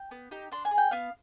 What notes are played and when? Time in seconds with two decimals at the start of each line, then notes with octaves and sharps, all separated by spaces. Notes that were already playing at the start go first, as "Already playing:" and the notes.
Already playing: G5
0.11 B3
0.31 D#4 G4
0.51 D4 C6
0.65 G#5
0.71 G#4
0.78 G5
0.91 B3 F5